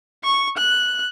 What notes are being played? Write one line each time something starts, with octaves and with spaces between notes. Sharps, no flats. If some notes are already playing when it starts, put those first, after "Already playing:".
C#6
F#6